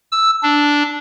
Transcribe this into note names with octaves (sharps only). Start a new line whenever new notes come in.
E6
D4